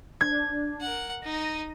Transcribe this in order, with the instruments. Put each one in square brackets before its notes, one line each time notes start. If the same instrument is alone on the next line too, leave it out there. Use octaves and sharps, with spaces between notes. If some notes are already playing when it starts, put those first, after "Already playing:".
[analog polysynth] D4 [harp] G#6
[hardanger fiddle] A#4 F#5
[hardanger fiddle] D#4 [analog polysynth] A#6 D#7